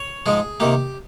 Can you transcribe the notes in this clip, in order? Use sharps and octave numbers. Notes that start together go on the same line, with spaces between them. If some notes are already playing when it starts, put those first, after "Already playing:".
Already playing: C#5
G#2 F3 G#3 G#4
C3 D#3 A#3 G4